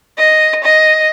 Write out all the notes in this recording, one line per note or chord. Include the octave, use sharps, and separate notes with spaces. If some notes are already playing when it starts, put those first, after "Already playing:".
D#5
D#5